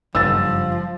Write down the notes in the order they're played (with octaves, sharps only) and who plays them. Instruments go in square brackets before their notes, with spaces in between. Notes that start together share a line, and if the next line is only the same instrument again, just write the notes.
[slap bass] F#1 G2 G3 [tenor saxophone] F3 [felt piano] E6 A6